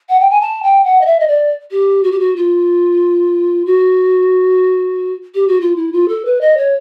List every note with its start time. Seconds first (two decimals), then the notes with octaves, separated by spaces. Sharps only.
0.09 F#5
0.20 G5
0.30 G#5
0.41 A5
0.63 G5
0.84 F#5
1.01 D#5
1.06 E5
1.20 D#5
1.28 D5
1.71 G4
2.03 F#4
2.12 G4
2.20 F#4
2.36 F4
3.66 F#4
5.35 G4
5.48 F#4
5.61 F4
5.76 E4
5.93 F4
6.08 A4
6.25 B4
6.41 D#5
6.57 C#5